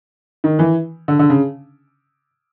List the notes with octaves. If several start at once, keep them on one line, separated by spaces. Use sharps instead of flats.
D#3
E3
D3
D3
C#3